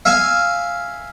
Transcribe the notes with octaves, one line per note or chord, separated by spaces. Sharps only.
E5 F5 G#5